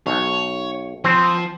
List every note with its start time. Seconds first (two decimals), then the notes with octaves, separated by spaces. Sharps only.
0.07 B1 C#5
1.04 F3 C4 C5